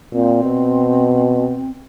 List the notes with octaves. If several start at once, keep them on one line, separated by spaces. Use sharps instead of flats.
A#2 C4
B2